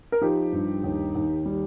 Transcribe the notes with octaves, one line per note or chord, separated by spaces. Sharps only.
A#4
F3 D#4 G4
G2
D#2
D#2
G3